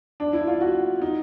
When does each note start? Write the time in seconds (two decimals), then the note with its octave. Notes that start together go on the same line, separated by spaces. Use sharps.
0.20 D4
0.33 E4
0.47 F4
0.61 F#4
1.02 D#4